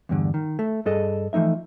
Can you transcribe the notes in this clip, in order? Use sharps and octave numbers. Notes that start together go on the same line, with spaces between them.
E2 G2 D3
D#3
A3
G2 G#4 A4 D#5
E3 F3 A3 D#4 E5